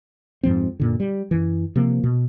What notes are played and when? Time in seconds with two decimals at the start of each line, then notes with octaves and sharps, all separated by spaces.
0.43 F2 G#2 F3 C4
0.80 F#2 A#2 D3
1.00 G3
1.31 F#2 E3
1.76 C3 F3 A#3
2.04 B2